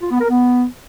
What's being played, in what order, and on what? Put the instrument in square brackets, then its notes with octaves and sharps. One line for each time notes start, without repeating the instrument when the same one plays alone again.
[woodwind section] F4
B3
A#4
B3